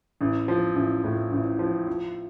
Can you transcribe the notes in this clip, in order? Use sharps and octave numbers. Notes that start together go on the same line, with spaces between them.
A1
F3
A1
A2
A1
F3
F3